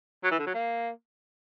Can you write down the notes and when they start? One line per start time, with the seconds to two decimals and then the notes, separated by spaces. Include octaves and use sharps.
0.24 F#3
0.32 E3
0.39 D3
0.47 F#3
0.54 A#3